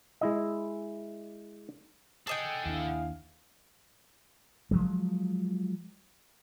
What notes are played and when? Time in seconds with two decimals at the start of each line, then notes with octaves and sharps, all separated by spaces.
0.21 G#3 E4 D#5
2.27 G#4 A4 D#5 F#5 G5
2.66 D#2 D4 E4 F5
4.71 F3 F#3 G#3